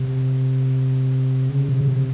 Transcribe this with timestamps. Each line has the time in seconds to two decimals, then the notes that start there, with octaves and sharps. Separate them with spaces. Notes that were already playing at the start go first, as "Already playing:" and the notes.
Already playing: C3
1.49 C#3
1.69 C3
1.81 C#3
1.88 C3